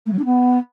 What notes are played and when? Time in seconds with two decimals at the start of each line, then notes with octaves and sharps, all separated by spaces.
0.06 A3
0.12 F#3
0.19 D4
0.25 B3